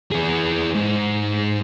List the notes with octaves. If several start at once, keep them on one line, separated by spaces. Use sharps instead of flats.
E3 G#4
G#2